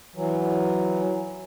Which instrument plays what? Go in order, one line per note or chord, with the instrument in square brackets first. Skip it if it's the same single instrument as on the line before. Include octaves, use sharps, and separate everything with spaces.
[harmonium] E3 F#3